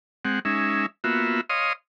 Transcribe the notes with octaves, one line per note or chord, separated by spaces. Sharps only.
G#3 C4 F#5
G#3 C#4 D#4 E5
A#3 B3 F4 F#4 E5
C#5 D#5 F5 C6 D#6